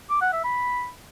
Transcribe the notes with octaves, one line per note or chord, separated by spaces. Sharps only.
D6
F#5
E5
B5